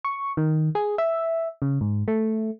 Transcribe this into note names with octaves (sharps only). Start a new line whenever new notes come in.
C#6
D#3
G#4
E5
C#3
G#2
A3